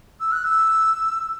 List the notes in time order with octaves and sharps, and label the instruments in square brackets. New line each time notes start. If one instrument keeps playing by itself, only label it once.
[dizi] E6
F#6
E6